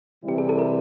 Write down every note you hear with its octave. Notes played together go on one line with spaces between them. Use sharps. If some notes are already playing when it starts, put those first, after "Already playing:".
C3 E3 G3 C4 E4 G4
G#4
A4
A#4